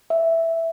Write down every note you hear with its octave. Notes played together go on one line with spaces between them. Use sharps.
E5